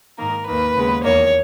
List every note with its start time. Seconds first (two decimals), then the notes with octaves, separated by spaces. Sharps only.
0.18 G#2 D#3 A#3 A#4
0.46 D#2 D#3 A#3 B4
0.75 D#2 C#3 G#3 B3
1.04 E2 D#3 A#3 C#5